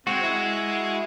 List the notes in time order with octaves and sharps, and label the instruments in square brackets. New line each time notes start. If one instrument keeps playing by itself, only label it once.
[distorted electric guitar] G#3 [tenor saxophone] C4 [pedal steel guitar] F#4
[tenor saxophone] E4